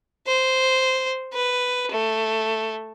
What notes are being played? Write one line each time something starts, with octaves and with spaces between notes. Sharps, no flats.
C5
B4
A3